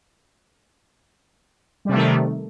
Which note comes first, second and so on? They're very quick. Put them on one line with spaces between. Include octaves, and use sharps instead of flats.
G3 C3 A3 D#3